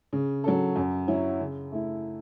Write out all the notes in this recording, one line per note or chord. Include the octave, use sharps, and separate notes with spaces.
C#3
F#3 C#4 A4
F#2
F#3 C#4 E4
C#3
A3 E4